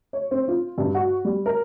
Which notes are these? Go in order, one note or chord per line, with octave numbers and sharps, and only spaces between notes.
C#5
C4
F4
G2
F#4
G3
A#4